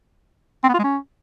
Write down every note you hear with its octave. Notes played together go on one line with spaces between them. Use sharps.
C4
B3
F4
G#3
C#4